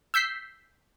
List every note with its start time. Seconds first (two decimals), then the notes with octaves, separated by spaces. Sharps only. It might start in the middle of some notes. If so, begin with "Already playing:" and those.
0.14 E6 G6 B6 C7